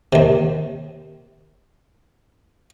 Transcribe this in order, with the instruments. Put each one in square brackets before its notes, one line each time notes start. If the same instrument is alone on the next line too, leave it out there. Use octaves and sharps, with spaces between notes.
[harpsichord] D#2 C3